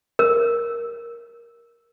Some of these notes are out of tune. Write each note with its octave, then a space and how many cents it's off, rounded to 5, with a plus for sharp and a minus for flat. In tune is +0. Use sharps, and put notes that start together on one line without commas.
A#4 +10